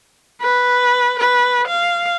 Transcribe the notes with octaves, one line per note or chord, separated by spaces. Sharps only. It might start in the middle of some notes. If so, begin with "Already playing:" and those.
B4
B4
F5